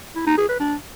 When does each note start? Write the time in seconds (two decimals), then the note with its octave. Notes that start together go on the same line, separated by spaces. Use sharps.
0.16 E4
0.27 D#4
0.38 G#4
0.49 B4
0.60 D4